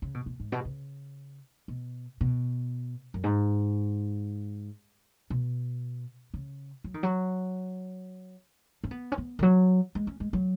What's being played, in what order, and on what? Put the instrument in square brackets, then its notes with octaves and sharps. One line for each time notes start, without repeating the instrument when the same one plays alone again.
[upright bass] C#3
B2
B2
G#2
B2
C#3
B2
B2
F#2
G#2
B2
C#3
F#3
D#3
F#3
C#4
B3
C#4
B3
D#3
F#3
G#3
C#4
G#3
F#3